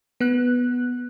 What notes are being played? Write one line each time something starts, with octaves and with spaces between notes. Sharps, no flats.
B3 F#6